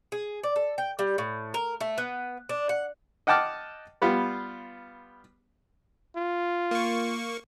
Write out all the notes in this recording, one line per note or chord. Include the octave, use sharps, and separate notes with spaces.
G#4
D5
A4
G5
G3
A2
A#4
A3
B3
D4
F#5
D#5 F#5 G5 A5 D6 F6
G3 B3 F4
F4
A#3 C#6